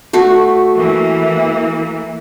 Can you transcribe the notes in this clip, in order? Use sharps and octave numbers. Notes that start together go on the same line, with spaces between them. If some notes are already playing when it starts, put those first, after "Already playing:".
A3 F#4
E3 A#3